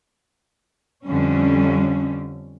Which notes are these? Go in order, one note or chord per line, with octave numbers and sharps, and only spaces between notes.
F2 D3 G3 C#4